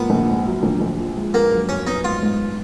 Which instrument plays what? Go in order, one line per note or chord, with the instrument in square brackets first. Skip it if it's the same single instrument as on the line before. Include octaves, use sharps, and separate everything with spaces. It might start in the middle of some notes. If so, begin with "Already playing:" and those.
Already playing: [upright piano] G#2 F3 A#3 [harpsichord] B3
[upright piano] A#1
G#2
F#3
A#1
A#1
F3
G#3
[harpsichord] A#3 [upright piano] B3
[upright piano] F#2
[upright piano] F#3 [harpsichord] C#4
[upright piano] B3 [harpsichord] D#4
[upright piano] G#2 [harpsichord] F4
[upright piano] G#2